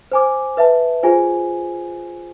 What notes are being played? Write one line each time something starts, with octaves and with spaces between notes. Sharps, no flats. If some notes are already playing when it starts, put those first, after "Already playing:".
C5 G#5 D6
B4 E5 A5
F4 G#4 C5 G#5